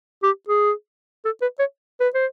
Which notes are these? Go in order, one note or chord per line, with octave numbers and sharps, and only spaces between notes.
G4
G#4
A4
B4
C#5
B4
C5